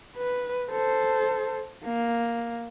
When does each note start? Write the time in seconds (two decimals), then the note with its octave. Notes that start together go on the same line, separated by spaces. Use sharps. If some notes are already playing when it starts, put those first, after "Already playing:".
0.17 B4
0.71 A4 C5
1.85 A#3